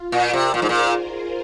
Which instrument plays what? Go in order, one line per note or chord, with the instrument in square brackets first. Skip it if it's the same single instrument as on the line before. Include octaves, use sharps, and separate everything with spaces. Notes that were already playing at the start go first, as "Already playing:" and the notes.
Already playing: [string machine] F4
[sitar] A#2 [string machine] F4 A#4
[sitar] C3
[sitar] A#2 [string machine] G#4 C5
[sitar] G#2
A#2